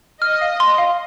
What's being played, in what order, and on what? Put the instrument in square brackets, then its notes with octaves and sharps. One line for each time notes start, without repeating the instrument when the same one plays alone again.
[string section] D#5 [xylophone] F6
[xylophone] F5
C6
F5